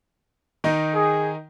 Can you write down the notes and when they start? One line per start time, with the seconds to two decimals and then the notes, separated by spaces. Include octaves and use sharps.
0.64 D#3 D#4
0.94 G#4